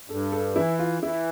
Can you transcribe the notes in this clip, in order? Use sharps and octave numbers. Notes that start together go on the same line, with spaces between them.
G2 A4
A4
E3 E4
F4
E3 E4